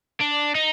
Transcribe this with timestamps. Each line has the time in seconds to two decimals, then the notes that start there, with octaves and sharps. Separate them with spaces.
0.21 D4
0.55 D#4